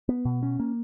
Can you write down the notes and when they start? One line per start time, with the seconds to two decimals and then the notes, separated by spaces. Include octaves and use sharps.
0.09 B3
0.25 B2
0.43 C#4
0.60 A#3